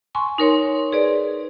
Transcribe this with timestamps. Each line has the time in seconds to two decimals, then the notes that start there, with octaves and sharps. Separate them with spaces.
0.15 G#5 C6 C#6
0.38 D#4 A#4 C#5 C6
0.92 G#4 B4 D5